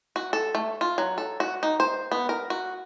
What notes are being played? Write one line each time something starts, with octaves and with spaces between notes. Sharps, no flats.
F#4
A4
A3
F4
F#3
A4
F#4
D#4
C5
B3
A#4
F#4